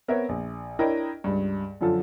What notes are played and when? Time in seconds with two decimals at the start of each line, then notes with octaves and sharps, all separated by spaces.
0.08 B3 C4 A#4 B4 C#5 E5
0.29 A#1
0.79 D4 E4 A#4 C#5 D#5 G5
1.24 C#2 G2
1.81 F#2 D3 F3 F4 A4